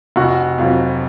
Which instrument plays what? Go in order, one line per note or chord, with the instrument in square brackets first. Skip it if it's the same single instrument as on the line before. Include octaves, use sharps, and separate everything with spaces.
[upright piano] F1 [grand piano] F#4
[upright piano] F2 C3 F#3 [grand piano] F4